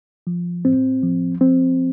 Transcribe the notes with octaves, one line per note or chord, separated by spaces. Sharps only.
F3
A2 C4
F3
F3 C4